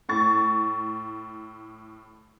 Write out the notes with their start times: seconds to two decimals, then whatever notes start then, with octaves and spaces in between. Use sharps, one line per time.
0.09 A2 C#6 A6